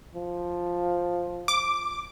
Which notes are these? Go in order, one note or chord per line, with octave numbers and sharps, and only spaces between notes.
F3
D6